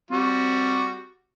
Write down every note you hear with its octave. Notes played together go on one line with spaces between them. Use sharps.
G3 C4 F#4